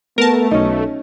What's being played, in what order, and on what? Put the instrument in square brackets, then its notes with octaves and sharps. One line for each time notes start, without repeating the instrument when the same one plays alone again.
[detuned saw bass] A3 [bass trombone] B3 [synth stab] A#4 A5
[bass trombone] B1 [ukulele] C#4 D#4